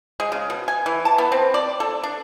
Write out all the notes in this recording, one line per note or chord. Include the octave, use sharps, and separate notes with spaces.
G#3
C#3
B2
G#5
E3
A5
B3
C4
D5
A4
D4